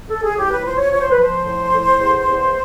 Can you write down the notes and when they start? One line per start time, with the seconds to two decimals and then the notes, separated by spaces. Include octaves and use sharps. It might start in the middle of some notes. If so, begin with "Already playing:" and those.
0.09 A4
0.23 G#4
0.36 A2 G4
0.50 B4
0.63 F3 C5
0.77 C#5
0.91 F3 C#5
1.00 C5
1.10 B4
1.19 F3 C5
1.45 A2
1.72 A2
1.99 E2
2.27 E2